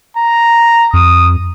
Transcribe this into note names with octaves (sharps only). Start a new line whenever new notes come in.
A#5
F2 D#6